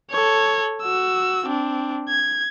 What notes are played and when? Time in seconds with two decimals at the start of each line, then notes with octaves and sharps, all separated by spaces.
0.11 A4 C#5
0.82 F#4 E6
1.47 C4 D4
2.09 G#6